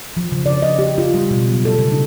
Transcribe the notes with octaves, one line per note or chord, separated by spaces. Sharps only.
F3
C#3
D5
D#5
G4
F4
G3
B2
F#3
A4
C#3
D#4